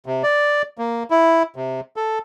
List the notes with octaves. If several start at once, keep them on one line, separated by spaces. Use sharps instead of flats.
C3
D5
A#3
E4
C3
A4